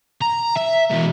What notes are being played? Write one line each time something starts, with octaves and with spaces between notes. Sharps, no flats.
A#5
E5
B2 E3